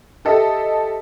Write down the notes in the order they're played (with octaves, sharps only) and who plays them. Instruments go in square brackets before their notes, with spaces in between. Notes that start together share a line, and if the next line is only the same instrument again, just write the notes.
[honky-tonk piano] G4 A4 D#5 E5